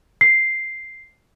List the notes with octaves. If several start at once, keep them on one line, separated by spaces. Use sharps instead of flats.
C7